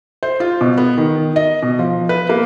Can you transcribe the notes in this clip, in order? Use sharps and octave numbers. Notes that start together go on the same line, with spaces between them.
C5
F4
B2
B3
D#3
D#5
B2
F3
B4
A#3